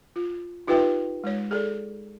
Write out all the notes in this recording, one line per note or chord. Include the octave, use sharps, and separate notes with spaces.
F4
D#4 F4 G4 B4 E5 G5
G#3 C#5
G#4 A4 D5